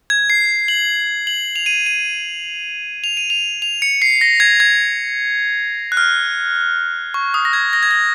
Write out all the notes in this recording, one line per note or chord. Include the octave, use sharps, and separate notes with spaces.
G#6
C7
F#7
F#7
F7
D#7
D#7
F7
D#7
F7
F7
C#7
C7
A#6
G#6
G#6
F#6
F6
C#6
D#6
A#6
G#6
A#6
G#6
A#6